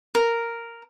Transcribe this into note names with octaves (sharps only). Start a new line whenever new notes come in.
A#4